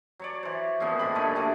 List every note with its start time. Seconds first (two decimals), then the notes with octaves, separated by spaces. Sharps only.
0.19 F#3 C#5 D5
0.43 E3 C5
0.80 A#2 C#3 F3 B3
0.99 G#2 D3 G4 B5
1.15 F#2 A#2 A3 G#5
1.35 C#3 E3 G3 D4